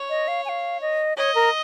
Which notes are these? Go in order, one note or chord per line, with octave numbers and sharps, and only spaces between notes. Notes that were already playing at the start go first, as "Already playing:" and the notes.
Already playing: C#5
D#5
F5
G#5
F5
D#5
C#5 D#5
A#4